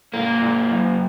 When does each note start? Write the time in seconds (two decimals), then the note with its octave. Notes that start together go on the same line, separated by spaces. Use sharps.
0.14 G#2 A#3
0.42 G#2
0.71 F#2